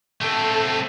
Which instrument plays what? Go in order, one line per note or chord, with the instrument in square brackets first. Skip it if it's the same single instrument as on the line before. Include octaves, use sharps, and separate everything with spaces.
[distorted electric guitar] A3 C4 [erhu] A4